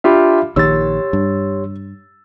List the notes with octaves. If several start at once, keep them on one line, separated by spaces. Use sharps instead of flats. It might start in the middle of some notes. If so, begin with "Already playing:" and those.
D4 F4 G4 E5 F5 B5
A#1 A#2 D#3 G4 C#5 C6 E6 A6
G2